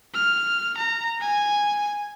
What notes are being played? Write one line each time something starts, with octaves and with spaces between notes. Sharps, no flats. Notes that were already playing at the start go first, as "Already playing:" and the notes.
F6
A#5
G#5